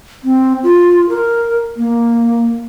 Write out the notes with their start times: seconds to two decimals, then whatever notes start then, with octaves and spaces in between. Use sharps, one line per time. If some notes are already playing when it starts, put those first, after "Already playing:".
0.24 C4
0.63 F4
1.09 A#4
1.77 A#3